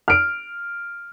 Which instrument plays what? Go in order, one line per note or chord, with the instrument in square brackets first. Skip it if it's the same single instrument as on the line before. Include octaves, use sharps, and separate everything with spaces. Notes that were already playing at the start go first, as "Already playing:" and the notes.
[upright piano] F6 D7